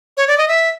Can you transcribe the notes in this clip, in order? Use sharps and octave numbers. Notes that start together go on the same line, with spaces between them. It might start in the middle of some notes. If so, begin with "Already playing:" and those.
C#5
D5
D#5
E5